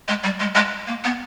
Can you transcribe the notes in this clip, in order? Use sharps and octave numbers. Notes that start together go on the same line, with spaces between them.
G#3
G3
G#3
G#3
A#3
B3